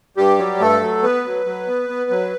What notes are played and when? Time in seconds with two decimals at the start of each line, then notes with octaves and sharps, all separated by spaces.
0.17 G2 G3 G4
0.39 F#3
0.60 G2 A3 A4
0.82 F#3
1.03 B3 B4
1.25 F#3
1.46 F#3
1.68 B3
1.89 B3
2.11 F#3